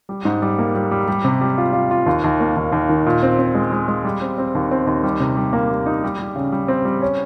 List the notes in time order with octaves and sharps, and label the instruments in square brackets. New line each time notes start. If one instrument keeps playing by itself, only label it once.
[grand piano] G3
G#2
G3
A#3
G3
G3
G3
C3
G3
F4
F4
F4
D#2
D#2
A#3
D#2
D#2
D#3
A#2
C4
C4
G#3
G#3
G#3
G3
C4
C4
D#2
C4
D#2
G3
C3
G3
A#3
G3
D#4
G3
G3
C#3
G3
C4
G3
C#4